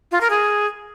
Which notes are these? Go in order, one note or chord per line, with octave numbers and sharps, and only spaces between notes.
F4
A#4
G#4